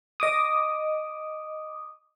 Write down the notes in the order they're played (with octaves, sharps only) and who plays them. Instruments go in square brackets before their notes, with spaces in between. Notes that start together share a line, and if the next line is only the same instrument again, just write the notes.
[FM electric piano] D#5 D6 D#6